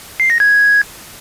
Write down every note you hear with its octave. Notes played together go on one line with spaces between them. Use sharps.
C7
A#6
G#6